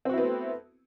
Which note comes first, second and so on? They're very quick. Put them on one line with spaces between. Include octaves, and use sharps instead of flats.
C4 F#4 E4 B3 A3